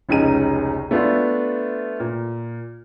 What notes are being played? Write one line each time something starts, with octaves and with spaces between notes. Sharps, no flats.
F1 C#2 C#4 D#4 G#4 D#7
A3 B3 D4 F4
A#2